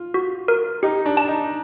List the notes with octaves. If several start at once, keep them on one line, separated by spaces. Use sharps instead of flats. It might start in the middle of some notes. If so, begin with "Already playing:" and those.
Already playing: F4
F#4
A#4
D#4 G4
D4
A5
D#4